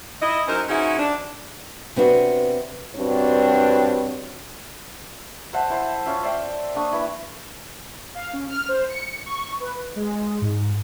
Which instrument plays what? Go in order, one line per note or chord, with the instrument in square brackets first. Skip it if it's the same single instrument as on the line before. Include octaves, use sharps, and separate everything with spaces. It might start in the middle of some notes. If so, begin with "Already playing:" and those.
[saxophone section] E4 D#5
F#3 C#4 D#4 A#4 C5
C#4 D#4 E4 F#4 G#4 C5
D4
[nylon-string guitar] C3 B3 D4 F#4
[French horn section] G2 B2 C4 D4 F#4 C#5
[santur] C5 E5 F#5 A5
E4 C5
C#4 F4 E5
C5 D5 E5 G5
A#3 D4 C#6 D#6
E4 B4
[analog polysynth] F5
C#4
F6
C5
C#7
C#6
B4
G#3
G#2